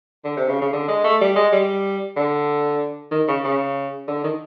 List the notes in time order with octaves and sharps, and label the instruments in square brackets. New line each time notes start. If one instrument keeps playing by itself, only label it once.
[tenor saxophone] D3
C3
C#3
C#3
D3
G#3
A3
G3
G#3
G3
D3
D#3
C#3
C#3
D3
D#3